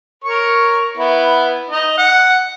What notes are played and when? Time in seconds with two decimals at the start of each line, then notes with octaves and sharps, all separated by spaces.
0.24 A#4 C#5 C#6
0.97 B3 E4
1.70 D#4 D#5
1.98 F#5